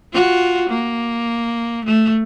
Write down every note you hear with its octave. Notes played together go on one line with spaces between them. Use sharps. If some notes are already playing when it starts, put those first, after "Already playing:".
F4 F#4
A#3
A3